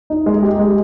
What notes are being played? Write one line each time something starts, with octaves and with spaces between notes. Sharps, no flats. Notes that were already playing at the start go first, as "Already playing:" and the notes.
D#4
G#3
G4
G#3